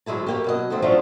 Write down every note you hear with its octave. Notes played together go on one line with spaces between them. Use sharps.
D2 F#3 G#3 E4 A5
A3 A#3 G4
B2 F#3 D#5
D#2 F#3 A3 C4
F3 F#3 A3 C#4 D4 F4